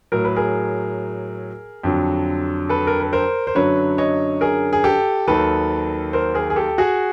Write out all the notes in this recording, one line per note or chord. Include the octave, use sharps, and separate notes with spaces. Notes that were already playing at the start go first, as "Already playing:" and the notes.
A2 F#3 A#4
B4
G#4 A#4
F2 D3 F#3
A4 B4
A#4
B4
A#4 C5
C5
F#2 D3 F#3 B4 C#5
C#5 D#5
G#4 A#4
G#4
G4 A4
D#2 D#3 F#3 A4 B4
A#4 C5
G#4 A#4
G#4
G4 A4
F#4 G#4